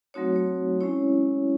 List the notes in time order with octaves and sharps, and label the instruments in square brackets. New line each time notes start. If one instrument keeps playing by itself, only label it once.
[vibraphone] F#3 A3 C4 D#4 F#4 C#5
C#5
G#3 C#4 E4 C#5